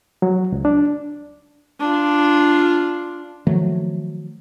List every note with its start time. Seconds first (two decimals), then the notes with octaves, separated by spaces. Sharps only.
0.22 F#3
0.52 C#2
0.65 D4
1.80 D4 F4
3.47 D#3 F3 F#3 A3